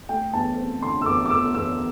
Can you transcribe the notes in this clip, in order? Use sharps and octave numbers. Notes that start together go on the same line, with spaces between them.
A3 G5
E2 A5
C4
D3 C6
E6
E2 D6
D6
E2 E6
E2 E6